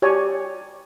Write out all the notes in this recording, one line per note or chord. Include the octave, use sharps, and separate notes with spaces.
G4 C#5 D5 G#5